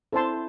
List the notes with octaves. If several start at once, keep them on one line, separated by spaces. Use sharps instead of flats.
C4 E4 A4 C5 A5 C6